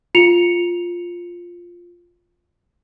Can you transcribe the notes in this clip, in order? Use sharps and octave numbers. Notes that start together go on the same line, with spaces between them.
F4 C#7 F7